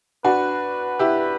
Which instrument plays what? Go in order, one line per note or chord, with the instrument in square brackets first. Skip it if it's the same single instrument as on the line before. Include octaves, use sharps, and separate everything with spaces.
[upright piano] D4 F#4 [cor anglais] B4
[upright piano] E4 G4